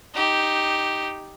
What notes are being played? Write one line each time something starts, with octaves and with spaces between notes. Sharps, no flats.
D#4 G4